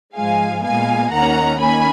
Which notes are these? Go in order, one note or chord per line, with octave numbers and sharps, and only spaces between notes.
G#2 F3 G#3 F5 G#5
A#2 G#3 B3 F5 G#5
D#2 D#3 A#3 C#4 F#5 A#5
D#3 A#3 C#4 G#5 B5